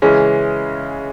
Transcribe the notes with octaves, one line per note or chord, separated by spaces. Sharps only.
C#3 E3 G#3 C#4